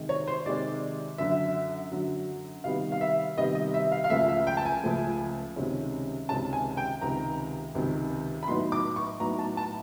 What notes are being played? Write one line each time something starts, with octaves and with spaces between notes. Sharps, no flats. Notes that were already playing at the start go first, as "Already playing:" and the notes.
Already playing: C3 D#3 G#3
C#5
C5
C3 D#3 G#3 D5
F#2 D3 F#3 E5
F#2 D3 F#3
C3 D#3 G3 B3 F5
F5
E5
C3 D#3 G3 B3 D#5
D#5
E5
F5
F5
C#2 C#3 F3 A3 E5
E5
G5
A5
G#5
C#2 C#3 F3 A3
C#2 C3 D#3 G#3 C#4
C#2 C3 D#3 G#3 C#4 A5
G#5
G5
C#2 C3 D#3 A#5
C#2 C3 D#3
B5
A2 F#3 B3 D#4 C6
D6
C#6
A2 F#3 B3 D#4 A#5
A5
A5